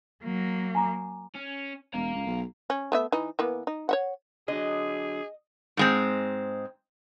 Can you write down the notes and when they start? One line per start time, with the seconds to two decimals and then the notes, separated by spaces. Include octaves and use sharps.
0.24 F#3 A#3
0.75 G#5 A#5 D6
1.35 C#4
1.94 E1 F5 A#5
2.15 C#2
2.27 B1
2.70 C#4
2.92 A3 B3 E5
3.12 E3 D#4
3.39 E3 A#3 B3
3.67 D#4
3.89 C#5 E5 F#5
4.48 D3 F#3 G#4 D#5
5.77 G#2 G#3 C4